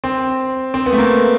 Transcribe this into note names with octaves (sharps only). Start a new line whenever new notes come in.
C4
C4
B3
A3
A#3